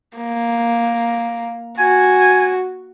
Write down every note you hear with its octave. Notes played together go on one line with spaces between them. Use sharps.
A#3
F#4 G#5